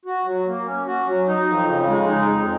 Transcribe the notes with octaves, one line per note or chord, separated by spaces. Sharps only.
F#4
F#3
A#3
C#4
F#4
F#3
D#4
F2
C#3
G#3
D#4
F2